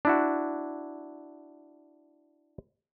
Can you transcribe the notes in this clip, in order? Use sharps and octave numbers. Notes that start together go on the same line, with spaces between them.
D4 E4 F#4